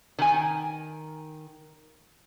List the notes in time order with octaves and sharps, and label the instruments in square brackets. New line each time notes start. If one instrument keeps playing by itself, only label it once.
[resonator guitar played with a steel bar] D#3 G#5